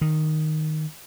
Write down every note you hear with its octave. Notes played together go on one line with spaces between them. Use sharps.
D#3